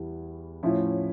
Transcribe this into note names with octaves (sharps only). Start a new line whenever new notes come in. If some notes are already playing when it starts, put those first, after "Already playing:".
Already playing: E2 E3 G3
A2 F3 C#4 E4